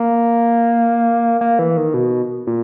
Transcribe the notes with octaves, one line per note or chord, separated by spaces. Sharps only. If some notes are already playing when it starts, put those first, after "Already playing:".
Already playing: A#3
A#3
E3
D#3
B2
A#2